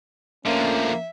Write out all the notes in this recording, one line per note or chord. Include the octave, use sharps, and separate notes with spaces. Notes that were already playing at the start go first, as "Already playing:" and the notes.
F2 D3 F3 A3 A#3 C#4 E5